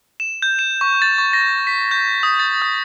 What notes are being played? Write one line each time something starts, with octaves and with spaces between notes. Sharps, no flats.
E7
G6
E7
C#6
A6
C#6
A#6
B6
G6
D#6
A6
D#6